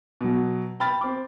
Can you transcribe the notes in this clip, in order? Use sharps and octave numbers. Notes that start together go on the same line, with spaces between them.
B2 F#3
G5 B5 F6 A6
C4 D6